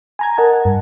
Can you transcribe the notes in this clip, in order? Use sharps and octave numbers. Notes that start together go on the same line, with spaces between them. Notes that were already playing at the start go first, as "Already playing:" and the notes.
G#5 A#5 G#6
A#4 D#5 F#5 A5
F#5
G2